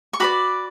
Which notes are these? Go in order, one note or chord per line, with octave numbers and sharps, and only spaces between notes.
C#6
F#4 B4 D5 B5 D6